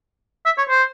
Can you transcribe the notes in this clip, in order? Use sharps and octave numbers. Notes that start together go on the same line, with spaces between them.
E5
C#5
C5